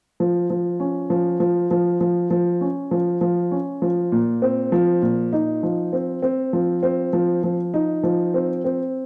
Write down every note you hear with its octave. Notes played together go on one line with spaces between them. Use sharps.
F3
F3
C#4
F3
F3
F3
F3
F3
C#4
F3
F3
C#4
F3
A#2
C4
F3
A#2
D#4
F3
C4
C4
F3
C4
F3
F3
D#4
F3
C4
C4